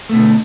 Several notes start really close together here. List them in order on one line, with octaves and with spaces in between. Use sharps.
A3 B2 D3